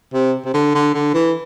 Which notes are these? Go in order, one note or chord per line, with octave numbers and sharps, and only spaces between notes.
C3
C3
D3
D3
D3
E3